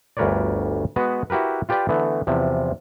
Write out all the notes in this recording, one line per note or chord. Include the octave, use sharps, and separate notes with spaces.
G1 D2 A#4 B4 C#5 D5
G#3 B3 F#4 B4
E4 F#4 G4 A#4 B4
F4 G4 B4 D5 G5
D3 E3 A3 B3
E2 C3 F3